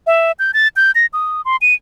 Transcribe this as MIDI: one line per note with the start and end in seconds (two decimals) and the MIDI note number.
0.07 0.32 76
0.39 0.51 91
0.54 0.68 93
0.76 0.91 91
0.95 1.06 94
1.13 1.41 87
1.45 1.57 84
1.62 1.74 99